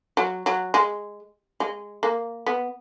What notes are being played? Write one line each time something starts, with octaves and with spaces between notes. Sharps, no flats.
F#3
F#3
G#3
G#3
A#3
B3